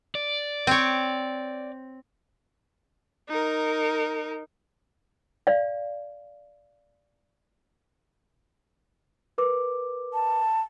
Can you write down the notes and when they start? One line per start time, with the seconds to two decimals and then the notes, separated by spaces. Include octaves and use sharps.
0.15 D5
0.67 C4 C#5
3.29 D#4 A#4
5.47 D5 F5
9.38 A#4 B4 D6
10.14 A5